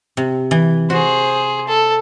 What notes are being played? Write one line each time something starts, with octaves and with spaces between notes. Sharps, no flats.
C3
E3
F#4 G#4 C5
A4